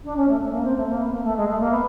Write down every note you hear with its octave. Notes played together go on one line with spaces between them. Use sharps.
D4
C#4
A3
A3
A#3
C4
A3
A#3
B3
A#3
A3
G#3
A3
A#3
B3